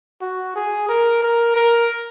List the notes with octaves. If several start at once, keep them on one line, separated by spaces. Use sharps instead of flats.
F#4
G#4
A#4
A#4
A#4